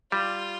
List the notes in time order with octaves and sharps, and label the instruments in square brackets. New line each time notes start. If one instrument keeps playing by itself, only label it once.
[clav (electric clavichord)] G3 [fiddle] F4